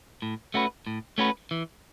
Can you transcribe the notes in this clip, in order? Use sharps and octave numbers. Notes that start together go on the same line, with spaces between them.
A2
A3 C#4 F#4 B4
A2
A3 C#4 F#4 B4
E3